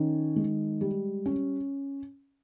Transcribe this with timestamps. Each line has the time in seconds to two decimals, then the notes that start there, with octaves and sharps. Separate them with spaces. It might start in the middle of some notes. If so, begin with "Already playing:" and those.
Already playing: D#3 C#4
0.36 G#3
0.81 G3
1.26 C#4